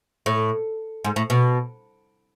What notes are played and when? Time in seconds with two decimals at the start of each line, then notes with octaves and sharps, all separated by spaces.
0.26 A2
1.05 G#2
1.16 A2
1.30 B2